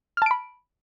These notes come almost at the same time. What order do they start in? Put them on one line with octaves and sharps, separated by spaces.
F6 A5 D7 B5